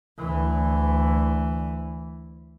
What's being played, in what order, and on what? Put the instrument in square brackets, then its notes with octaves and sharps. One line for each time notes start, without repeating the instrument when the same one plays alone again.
[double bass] D2 E3